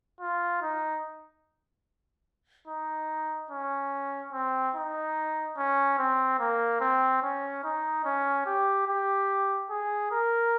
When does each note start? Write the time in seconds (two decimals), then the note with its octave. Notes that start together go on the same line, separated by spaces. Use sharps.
0.21 F4
0.62 D#4
2.68 D#4
3.51 C#4
4.33 C4
4.75 D#4
5.58 C#4
5.99 C4
6.39 A#3
6.81 C4
7.23 C#4
7.64 D#4
8.05 C#4
8.46 G4
8.88 G4
9.71 G#4
10.12 A#4